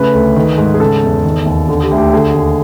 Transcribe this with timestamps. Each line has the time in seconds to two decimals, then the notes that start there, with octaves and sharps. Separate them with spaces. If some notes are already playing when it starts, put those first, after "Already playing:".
Already playing: A2 C#3 B4
0.13 D2
0.36 D#3
0.58 G#2
0.74 G#4
0.80 C#3 A4
1.03 E2
1.25 D#3
1.46 D#2
1.69 D3
1.83 G4
1.91 D2
1.98 G4
2.13 D3 G#4
2.34 D#2